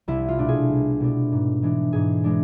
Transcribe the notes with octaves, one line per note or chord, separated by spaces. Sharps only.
C2 E4
F4
B2 A3 D4
G#4
C2
B2 A3 D4
G#2
E3 G#3 D4
G#2 G#4
E3 G#3 D4